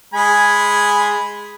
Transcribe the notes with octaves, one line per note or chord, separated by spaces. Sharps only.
G#3 G#5 B5